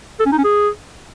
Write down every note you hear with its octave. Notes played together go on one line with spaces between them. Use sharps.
A4
C#4
D#4
C#4
G#4